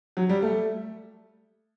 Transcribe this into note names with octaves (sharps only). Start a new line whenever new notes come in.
F#3
G3
A3